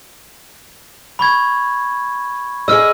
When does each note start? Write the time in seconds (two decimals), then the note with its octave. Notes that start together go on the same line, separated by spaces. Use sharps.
1.19 B5 C#6 G#6
2.68 G#4 D#5 E6 F6